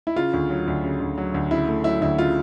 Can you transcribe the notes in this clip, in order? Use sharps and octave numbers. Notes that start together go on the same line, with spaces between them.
E4
C#3 F4
D2
F#3
D2
C#3
D2
F#3
D2
C#3 E4
A3
F#3 E4
D2 E4
C#3 F4